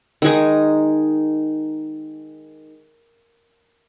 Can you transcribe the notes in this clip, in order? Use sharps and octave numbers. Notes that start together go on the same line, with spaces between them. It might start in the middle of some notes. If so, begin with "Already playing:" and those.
D#3 G#3 D#4